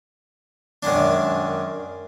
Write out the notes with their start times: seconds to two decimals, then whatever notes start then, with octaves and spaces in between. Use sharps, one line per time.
0.83 F#2 D#3 G#3 D4